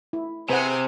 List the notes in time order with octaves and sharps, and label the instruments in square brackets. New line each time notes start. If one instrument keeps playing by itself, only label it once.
[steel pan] E4
[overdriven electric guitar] C3 [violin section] G#4 C5 G#5 [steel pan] B4 F#5